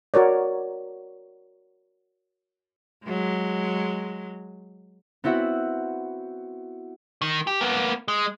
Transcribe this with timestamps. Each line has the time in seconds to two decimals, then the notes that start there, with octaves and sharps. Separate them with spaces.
0.14 F#4 A#4 C#5 D5
3.04 F#3 G#3
5.24 B3 C4 E4 F#4 E5 F#5
7.22 D#3
7.47 G4
7.61 A#3 B3
8.08 G#3